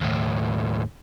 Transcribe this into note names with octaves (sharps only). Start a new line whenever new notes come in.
D#2 A2